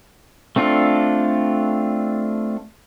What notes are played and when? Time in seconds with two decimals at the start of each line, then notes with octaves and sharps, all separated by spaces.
0.56 A3 C4 D4 F4 A4